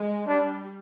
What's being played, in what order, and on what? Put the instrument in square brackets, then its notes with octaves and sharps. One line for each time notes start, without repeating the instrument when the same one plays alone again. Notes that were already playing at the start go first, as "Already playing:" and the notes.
Already playing: [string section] G#3
[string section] G3 [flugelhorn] D4